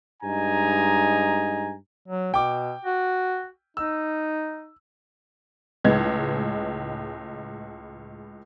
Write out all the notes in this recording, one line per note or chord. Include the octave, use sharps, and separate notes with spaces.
G2 G#3 D#4 G#5 A#5
F#3
B2 G5 D6
F#4
D#4 E6
C#2 A2 G#3 D#4 B4 G#6